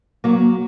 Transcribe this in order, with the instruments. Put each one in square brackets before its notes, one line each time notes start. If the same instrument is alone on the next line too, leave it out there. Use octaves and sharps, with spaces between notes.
[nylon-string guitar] F#3 A#3